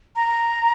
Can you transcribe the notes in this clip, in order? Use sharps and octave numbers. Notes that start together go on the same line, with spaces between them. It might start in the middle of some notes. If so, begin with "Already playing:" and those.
A#5